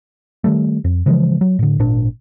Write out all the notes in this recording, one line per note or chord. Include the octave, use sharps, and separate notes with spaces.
D#3 E3 G3 A3
F2
C#3 E3 F3 G#3
F#3
A2 D3
G#1 A#2 D4